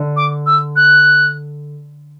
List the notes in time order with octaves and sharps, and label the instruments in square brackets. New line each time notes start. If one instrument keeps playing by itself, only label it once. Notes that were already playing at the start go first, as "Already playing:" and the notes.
Already playing: [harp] D3
[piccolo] D6
E6
F#6